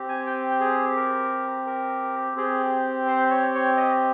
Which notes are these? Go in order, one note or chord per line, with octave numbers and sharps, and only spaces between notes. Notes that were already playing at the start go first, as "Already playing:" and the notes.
Already playing: C4 G4
G#5
G5
G#4
A#4
A#4
C4 G4 G#4
C5
C#5
C#5
D#5